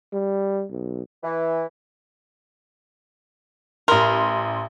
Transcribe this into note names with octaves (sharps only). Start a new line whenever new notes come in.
G3
B1
E3
A1 A#4 B5 C6